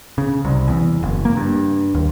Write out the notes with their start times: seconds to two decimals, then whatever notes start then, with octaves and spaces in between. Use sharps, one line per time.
0.18 C#3
0.45 C2
0.68 E2
1.03 F#1
1.25 A#3
1.37 G2
1.94 D#2